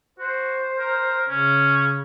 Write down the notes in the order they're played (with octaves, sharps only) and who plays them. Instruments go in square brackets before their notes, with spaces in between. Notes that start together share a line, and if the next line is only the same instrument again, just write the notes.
[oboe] F#4 [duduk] C5
[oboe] A#4
[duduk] C#3 [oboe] C#4